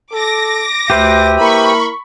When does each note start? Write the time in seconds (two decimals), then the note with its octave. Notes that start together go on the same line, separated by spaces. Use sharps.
0.12 A4 D6 A#6
0.90 D2 G4 B4 C5 E5
1.39 A#3 E4 A#4 B5 C#6